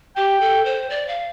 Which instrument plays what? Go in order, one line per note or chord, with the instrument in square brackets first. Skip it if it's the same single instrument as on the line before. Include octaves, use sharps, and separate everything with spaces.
[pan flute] G4 [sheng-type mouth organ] G5
[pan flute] A4
C5
D5
F5